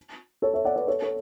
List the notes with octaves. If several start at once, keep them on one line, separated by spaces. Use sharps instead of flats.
A4 C#5
C#5 E5
D5 F#5
B4 D5
A4 C#5
A4 C#5